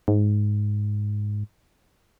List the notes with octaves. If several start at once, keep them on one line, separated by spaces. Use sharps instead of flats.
G#2